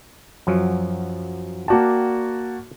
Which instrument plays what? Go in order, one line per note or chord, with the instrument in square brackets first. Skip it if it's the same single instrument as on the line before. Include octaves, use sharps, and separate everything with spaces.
[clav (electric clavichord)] F#2 F3 F#3
[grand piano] A#3 F#4 A5 [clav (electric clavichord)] D5 F#5 G5